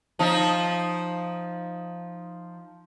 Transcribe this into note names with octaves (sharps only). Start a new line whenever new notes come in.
F3 D#4